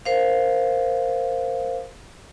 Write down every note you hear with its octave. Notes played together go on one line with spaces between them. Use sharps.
A#4 C5 F5